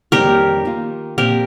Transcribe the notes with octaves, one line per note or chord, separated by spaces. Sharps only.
F2 D#3 G3 A#3 C#4 G4 A#4
D#3 A#3 F4
A#2 F3 C4 G4 A#4